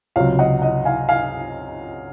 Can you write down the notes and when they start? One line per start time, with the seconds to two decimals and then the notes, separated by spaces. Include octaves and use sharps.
0.16 C#2 C3 F#3 C#5 F5
0.39 D#5 F#5
0.62 D#5 F#5
0.85 F5 G#5
1.09 F5 G#5